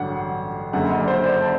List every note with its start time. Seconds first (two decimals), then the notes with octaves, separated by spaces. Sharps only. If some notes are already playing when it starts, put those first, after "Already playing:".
Already playing: A1 G2 D3 F#3 F#5
0.73 F#1 F#2 D3 F#5
0.90 D#5
1.00 D5
1.08 C5
1.24 D5
1.41 A5